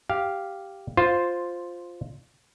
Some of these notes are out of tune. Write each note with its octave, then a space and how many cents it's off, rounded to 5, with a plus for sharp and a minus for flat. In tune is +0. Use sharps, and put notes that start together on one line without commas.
G4 +0 F5 +0
F4 +5 C5 +0